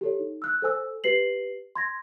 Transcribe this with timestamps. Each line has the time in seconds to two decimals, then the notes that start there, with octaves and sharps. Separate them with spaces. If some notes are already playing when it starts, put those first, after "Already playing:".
0.01 G4 A4 C#5
0.19 D#4
0.42 E6 F#6
0.62 A4 C5 G#5 E6
1.04 G4 B4 C7 F#7
1.76 C6 G#6 A#6